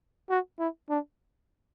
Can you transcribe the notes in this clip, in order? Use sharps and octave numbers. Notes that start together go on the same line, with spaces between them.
F#4
E4
D4